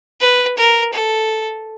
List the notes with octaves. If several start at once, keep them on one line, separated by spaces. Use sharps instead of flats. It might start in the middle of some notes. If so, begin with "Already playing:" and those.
B4
A#4
A4